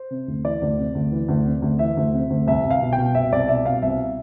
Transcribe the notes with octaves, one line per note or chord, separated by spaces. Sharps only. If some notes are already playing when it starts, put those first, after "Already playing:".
Already playing: C5
C3
D2
E3 D5
D2
C3
D2
E3
D2
C3
D2
E3 E5
D2
C3
D2
C2 E5
C2
F5
B2
G5
B2
C2 E5
C2 D5
B2 E5
B2 F5
C2 E5